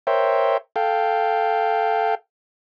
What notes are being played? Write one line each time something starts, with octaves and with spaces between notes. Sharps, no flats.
A#4 C5 C#5 E5 G5
A4 F5 G5